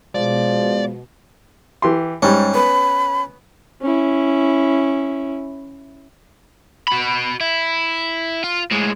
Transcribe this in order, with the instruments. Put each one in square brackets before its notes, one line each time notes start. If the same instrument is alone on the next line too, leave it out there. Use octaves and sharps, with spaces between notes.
[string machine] B2 [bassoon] F3 [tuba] G#3 [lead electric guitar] D5
[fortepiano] E3 G4 C6
[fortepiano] G#2 G3 [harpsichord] C#4
[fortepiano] B3 [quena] B5
[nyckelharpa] C#4 E4
[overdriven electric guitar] F#4 B5
E4
F4
A2 G#3